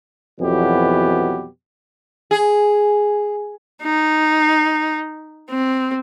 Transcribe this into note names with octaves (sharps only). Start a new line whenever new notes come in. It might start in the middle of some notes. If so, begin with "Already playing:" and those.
F2 B2 E3 F#3 B3 G4
G#4
D#4
C4